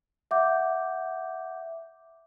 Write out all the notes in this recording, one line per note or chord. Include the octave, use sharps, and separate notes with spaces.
E5 F#5 D6 G6